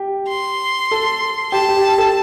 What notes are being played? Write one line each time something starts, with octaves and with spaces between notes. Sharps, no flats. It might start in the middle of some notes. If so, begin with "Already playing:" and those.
Already playing: G4
C6
A4
G4 A5
G4
A4